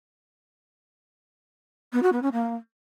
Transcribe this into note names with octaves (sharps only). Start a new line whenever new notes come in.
B3
F#4
B3
C#4
A#3